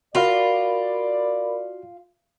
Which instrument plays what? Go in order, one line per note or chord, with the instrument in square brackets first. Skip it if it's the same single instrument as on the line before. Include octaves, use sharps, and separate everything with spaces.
[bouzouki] F4 [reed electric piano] F#4 F5 [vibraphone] A#4 B5 [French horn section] D5